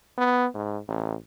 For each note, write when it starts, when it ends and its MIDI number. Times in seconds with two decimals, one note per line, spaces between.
0.18 0.46 59
0.54 0.78 44
0.88 1.14 33